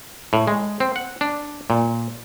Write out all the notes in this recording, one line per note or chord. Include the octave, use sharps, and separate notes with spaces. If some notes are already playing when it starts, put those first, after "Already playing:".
A2
G#3
C4
F#5
D4
A#2